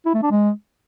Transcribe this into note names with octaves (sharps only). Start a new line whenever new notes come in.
E4
A3
D4
G#3